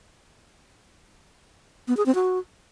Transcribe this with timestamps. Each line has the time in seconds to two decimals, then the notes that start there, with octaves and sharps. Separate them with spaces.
1.88 B3
1.97 G#4
2.06 C4
2.15 F#4